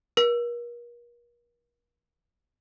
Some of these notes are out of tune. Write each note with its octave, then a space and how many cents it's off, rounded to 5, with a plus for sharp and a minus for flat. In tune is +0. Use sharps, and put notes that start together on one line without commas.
A#4 +40